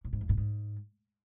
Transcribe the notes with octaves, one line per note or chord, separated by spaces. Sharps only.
A2
G#2
F2
A2
G#2